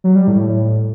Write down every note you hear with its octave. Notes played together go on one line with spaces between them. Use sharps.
F#3
G3
A2
A2